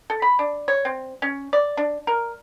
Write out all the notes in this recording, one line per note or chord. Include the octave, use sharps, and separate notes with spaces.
A4
B5
D4
C#5
C4
C#4
D5
D4
A#4